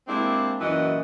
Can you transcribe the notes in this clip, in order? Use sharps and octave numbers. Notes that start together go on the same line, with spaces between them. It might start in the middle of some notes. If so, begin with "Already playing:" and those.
G#3 A#3 C4 D4 E4 G4
F#2 A#2 E3 F#4 D#5 F#5